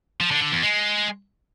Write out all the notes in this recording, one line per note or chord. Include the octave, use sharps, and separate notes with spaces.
F3
D3
D3
E2
G#3